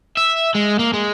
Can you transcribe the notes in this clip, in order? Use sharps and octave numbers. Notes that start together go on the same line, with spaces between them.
E5
G#3
A#3
G#3